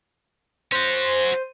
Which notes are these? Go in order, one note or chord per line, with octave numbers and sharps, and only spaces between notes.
C#4 F#4 C5